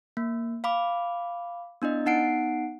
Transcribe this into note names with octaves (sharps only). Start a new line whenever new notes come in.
A#3
F5 B5 D6
B3 D4 E4 D#5
B3 D#4 F#5 C7 D7